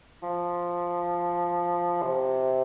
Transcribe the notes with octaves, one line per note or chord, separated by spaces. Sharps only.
F3
C3